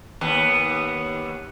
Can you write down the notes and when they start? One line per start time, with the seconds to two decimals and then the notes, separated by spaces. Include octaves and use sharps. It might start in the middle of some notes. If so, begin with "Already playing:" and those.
0.21 D#2 B3